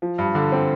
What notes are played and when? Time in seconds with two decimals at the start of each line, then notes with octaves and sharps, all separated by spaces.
0.02 F3
0.18 G2
0.35 D3
0.52 C4